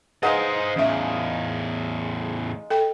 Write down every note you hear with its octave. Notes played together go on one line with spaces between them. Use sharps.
G#3 D#4 B4 C5 D#5 F5 F#5
E2 A2 C#4 E5
A4 G5